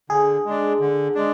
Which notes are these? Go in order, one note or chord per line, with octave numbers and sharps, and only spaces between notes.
D3 G#4
G#3 D4
D3
G#3 D4